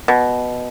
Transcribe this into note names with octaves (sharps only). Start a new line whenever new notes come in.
B2